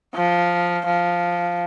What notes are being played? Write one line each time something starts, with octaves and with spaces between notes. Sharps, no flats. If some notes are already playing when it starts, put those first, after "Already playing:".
F3
F3